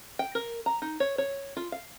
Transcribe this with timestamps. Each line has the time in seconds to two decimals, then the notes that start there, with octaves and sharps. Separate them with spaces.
0.19 G5
0.35 A#4
0.66 A#5
0.82 D#4
1.00 C#5
1.18 C#5
1.57 F4
1.72 F5